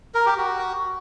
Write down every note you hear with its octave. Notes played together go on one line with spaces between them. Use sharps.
A#4
G4
F#4